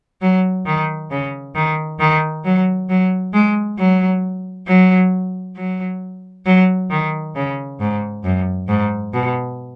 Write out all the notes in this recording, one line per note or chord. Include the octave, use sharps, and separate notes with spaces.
F#3
D#3
C#3
D#3
D#3
F#3
F#3
G#3
F#3
F#3
F#3
F#3
D#3
C#3
G#2
F#2
G#2
B2